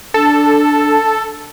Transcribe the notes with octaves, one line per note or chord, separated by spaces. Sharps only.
D4 A4